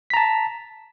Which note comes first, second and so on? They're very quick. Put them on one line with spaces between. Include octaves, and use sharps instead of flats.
B6 A#5 A5